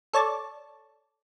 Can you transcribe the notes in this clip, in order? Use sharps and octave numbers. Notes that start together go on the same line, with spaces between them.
A4 C#5 D5 A5